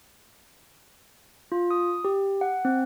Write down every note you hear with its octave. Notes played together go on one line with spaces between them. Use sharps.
F4
D#6
G4
F#5
C4